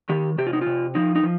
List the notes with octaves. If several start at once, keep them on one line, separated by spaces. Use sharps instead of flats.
D#3 G4
C3 G4
F4
D#4
C3 F4
F3 D#4
D#4
F3